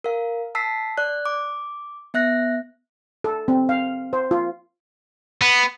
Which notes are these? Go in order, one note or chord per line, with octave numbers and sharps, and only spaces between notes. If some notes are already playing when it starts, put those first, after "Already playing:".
A#4 F5
A5 E6 B6 C7
D5 F#6
D6
B3 E5 F#6 A#6
A4
C4
F5
C5
F4
B3